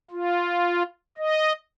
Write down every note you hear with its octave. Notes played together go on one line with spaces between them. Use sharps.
F4
D#5